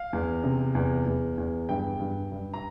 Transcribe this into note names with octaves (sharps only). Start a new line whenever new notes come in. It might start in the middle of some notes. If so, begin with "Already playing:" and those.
Already playing: F5
E2
C3
E2
E2
E2
G2 G5
G2
G2
A#5